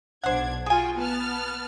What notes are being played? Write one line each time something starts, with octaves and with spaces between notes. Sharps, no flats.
B1 D4 C5 F#5 G#6
F4 F#4 G#4 G5 G#5
B3 A5 F6